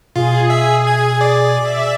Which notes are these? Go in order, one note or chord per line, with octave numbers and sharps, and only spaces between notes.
B2 F4 G#4
E5
G#6
D5
E5